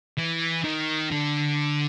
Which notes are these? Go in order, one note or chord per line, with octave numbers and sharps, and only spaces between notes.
E3
D#3
D3